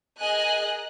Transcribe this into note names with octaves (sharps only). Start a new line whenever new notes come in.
G#4 A#4 D#5 G#5 F#6